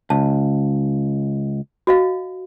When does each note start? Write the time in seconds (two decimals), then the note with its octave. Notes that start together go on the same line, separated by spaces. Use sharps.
0.10 C#2 A5
1.87 F#4 D#5 F5